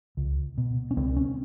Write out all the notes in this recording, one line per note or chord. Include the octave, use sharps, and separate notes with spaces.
C#2
B2
C#4
C#2 C4
C#4